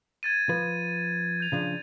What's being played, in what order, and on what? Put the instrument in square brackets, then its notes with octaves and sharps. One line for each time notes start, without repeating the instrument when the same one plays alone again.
[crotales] G#6 A6 D#7
[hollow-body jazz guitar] F3 B4
[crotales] G6 F7
[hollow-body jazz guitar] C#3 F3 D4